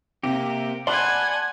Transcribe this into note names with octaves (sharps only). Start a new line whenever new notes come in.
C3 A#3 G4
D5 F#5 G#5 A5 B5 C6